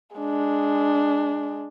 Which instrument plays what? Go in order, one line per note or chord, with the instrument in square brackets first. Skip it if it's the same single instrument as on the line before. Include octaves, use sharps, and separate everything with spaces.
[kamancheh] G#3 D4